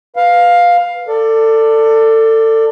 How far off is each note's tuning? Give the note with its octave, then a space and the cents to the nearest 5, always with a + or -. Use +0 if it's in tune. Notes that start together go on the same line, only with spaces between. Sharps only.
B4 +0 F5 +10
A4 +25 D5 +5